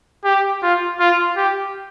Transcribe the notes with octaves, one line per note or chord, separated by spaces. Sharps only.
G4
F4
F4
G4